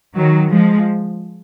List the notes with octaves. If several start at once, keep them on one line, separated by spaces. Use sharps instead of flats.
D#3 F#3
F3 G#3